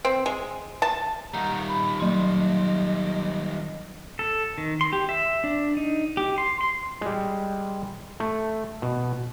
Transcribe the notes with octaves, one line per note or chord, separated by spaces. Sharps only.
C4
G#3
A5
D#3 G3 F#5 A#5 G6
B5
F#3 D#5 C6
A4
D#3
C6
G4
E5
D4
D#4
G4
C6
C6
G3 G#3
A3
B2